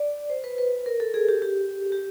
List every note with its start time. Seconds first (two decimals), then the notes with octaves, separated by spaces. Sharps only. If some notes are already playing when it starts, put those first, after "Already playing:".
Already playing: D5
0.30 C5
0.44 B4
0.58 B4
0.86 A#4
1.00 A4
1.14 G#4
1.29 G4
1.42 G4
1.92 G4